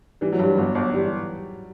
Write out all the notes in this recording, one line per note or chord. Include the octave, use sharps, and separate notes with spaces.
E3 G3
F#3
G2 G3
G1 F#3
G1
E3 G3